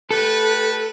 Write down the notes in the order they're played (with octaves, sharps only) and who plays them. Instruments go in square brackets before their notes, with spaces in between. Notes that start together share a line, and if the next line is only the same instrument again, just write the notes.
[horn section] A3 G4 B4 [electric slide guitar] A4